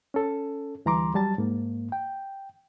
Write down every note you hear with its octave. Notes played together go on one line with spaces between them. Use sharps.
C#4 A4
D2 E3 G3 A#5 C6 D6
F#3 G3 A5 A6
G#2 A#3
G5